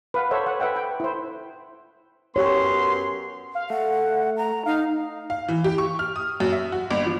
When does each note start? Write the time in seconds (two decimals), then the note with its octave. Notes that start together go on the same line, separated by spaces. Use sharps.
0.14 B4 F5 F#5
0.31 A4 C5 C#5 E5 F#5
0.47 F#5
0.60 A4 B4 E5 F#5 G5
0.76 G5
1.00 E4 C5
2.36 F#2 B3 G4 C#5 C6
3.55 F5
3.70 A3 F#5
4.37 A#5
4.66 D#4 F5
5.30 F5
5.48 E3
5.64 G4
5.78 C#6
5.99 F6
6.16 D#6
6.40 F#2
6.52 E5
6.72 F#4
6.91 G1
7.06 F3